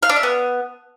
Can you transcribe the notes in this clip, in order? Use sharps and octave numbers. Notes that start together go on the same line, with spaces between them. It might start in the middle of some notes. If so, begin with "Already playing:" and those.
F5
D4
E5
B3